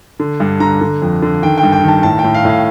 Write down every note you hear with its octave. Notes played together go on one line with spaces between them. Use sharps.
D3
G2
D3 A#5
D3
F2
D3
D#3 G5
G5
G2
G5
D#3 A5
A2 A5
G5
A2
F5
A2 F5